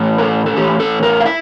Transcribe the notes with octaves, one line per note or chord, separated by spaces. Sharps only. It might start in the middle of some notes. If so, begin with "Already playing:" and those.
Already playing: A2 E3 A3 C#4
A#4
A4
A4
A2 E3 A3 C#4 G4
A4
A#4
F5
E4 E5